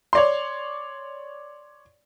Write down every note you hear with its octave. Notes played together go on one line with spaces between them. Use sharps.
C#5 D5 C6